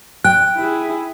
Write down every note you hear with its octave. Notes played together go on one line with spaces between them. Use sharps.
G5 F#6
E4 G#4